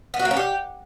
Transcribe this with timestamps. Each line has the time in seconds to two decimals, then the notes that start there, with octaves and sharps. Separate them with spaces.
0.14 B3
0.19 F#4
0.25 A#3
0.31 C#4
0.37 G4